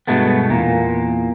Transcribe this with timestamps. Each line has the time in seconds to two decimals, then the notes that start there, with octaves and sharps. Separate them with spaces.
0.07 G2 B2 G#3 A3 B3
0.50 E2 A#2 A#3